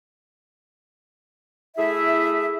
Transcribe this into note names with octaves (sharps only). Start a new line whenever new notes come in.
A3 E4 G#4 E5